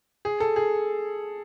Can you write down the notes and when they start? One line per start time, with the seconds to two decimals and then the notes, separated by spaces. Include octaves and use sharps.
0.25 G#4
0.40 A4
0.56 G#4